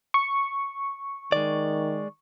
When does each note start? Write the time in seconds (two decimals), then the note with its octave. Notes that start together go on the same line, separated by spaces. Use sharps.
0.14 C#6
1.32 D#3 G#3 D5